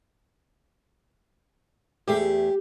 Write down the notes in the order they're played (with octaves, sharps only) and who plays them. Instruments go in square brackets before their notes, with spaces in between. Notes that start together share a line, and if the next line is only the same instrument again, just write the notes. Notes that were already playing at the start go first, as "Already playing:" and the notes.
[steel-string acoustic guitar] E2 A3 G#4 [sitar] G4